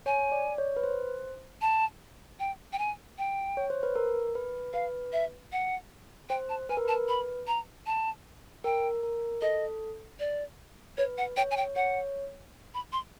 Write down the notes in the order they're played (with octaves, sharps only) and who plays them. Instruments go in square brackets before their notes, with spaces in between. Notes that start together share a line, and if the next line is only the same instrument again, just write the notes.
[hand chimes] C#5 [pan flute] G#5
[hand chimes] D5
C#5
B4
C5
[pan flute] A5
G5
G5
G#5
G5
[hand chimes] C#5
C5
B4
A#4
B4
[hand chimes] B4 [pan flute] F5
[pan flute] E5
F#5
[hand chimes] C5 [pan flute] G5
[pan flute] A5
[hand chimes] B4 [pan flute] G#5
[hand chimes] A#4
[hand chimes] B4 [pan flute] A5
[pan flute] B5
A#5
A5
[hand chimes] A#4 [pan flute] G5
[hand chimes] A#4
[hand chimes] A4 [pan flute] D#5
[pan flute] D5
[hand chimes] B4 [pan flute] C#5
[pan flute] F#5
[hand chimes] C#5 [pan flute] G5
[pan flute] G#5
G5
[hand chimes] C#5 [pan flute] F#5
[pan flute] B5
C6